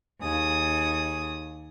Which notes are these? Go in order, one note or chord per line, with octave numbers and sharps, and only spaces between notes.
D#2 G#4 D#6